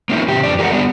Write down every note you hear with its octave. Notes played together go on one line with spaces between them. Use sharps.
A#3 C#4 D#4 E4
C#3 G4
F2 D4 D5
G4 G#4 A#4 B4 D5 F#5
G3 B3 D4 G4